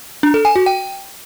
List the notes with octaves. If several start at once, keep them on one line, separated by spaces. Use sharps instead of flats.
D4
A4
G#5
F#4
G5